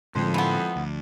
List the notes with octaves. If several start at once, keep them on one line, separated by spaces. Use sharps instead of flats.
F2 A2 D3 F3 G#3 C6
E3 B3 C6
D2